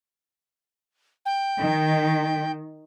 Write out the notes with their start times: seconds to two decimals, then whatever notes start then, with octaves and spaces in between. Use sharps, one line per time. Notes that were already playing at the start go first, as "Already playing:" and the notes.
1.26 G5
1.61 D#3